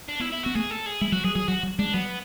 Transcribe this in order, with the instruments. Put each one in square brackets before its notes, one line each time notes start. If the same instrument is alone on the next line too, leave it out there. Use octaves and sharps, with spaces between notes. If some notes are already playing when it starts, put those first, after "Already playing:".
[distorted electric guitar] D4
[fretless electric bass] B3 [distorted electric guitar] E4
[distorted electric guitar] E4
[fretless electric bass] B3 [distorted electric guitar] F#4
[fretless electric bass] A3 [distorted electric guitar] G#4
[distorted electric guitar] A4
G#4
[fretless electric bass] G#3 [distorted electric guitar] E4
[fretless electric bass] F#3 [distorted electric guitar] F#4
[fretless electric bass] F#3 [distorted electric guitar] G#4
[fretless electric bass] F#3 [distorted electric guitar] G#4
[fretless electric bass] F#3 [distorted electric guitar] F#4
[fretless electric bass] F#3
[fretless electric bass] G#3 [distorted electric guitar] D4
[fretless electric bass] F#3 [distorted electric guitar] B3